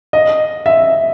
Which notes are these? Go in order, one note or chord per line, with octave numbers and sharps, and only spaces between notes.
D#5
E5